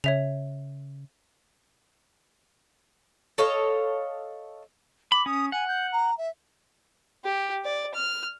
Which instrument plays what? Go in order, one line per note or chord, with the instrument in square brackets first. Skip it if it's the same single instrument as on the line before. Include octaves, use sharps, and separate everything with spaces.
[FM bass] C#3 [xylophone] C#5 E5 F7
[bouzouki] A4 C#5 D#5 F5
[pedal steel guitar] B5 [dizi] D6
[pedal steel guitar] C#4 [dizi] D#6
[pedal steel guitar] F#5 [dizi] G#5
[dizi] G6
A#5
E5
[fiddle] G4
D5
F6